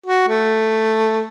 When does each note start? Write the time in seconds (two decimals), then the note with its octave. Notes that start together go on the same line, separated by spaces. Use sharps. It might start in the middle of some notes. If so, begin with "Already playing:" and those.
0.06 F#4
0.28 A3